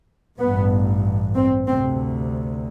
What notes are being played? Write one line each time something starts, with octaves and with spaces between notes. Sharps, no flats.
A1 G2 B3
C4
D2 C3 C4